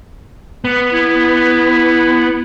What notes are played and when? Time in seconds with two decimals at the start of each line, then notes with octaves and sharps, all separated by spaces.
0.64 B3
0.92 E4